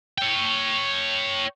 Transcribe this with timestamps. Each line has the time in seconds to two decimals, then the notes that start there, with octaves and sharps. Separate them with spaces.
0.18 C#5 G5